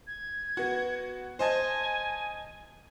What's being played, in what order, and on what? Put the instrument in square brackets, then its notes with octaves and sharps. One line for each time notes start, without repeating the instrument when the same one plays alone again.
[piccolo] G#6
[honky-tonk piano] B3 F#4
[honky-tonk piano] C5 D#5 A5 [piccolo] G#5